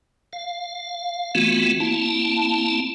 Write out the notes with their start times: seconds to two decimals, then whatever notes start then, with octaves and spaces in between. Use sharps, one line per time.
0.33 F5
1.35 E3 A3 B3 C4 F4 F#4
1.80 A#3 C4 E4 A5